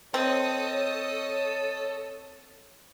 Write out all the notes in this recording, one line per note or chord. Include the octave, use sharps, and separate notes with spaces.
C4 A4 C#5 D#5 D#6